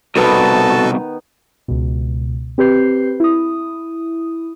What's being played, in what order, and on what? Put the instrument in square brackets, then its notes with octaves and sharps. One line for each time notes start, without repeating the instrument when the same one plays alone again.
[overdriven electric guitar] C2 B2 [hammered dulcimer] D#3 B3 [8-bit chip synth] F#4 A4 B4 [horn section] A5
[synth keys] C#2 B2
C4 G4 B4 G6 C7
E4 D#6